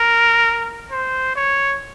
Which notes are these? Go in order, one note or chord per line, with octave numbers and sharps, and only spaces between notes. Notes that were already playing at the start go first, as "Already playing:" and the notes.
Already playing: A#4
C5
C#5